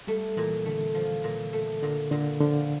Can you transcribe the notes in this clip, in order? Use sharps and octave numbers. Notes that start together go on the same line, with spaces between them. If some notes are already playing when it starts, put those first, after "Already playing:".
G3 A3
A#2 E3
D3 A3
F3
A#2
A3
A#2 D3
A#2 D3
D3 F3